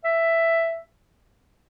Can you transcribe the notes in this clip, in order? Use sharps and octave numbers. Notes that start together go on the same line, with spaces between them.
E5